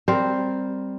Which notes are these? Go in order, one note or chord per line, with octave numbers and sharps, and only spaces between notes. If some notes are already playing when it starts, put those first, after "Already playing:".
G3 C4 A#4 C5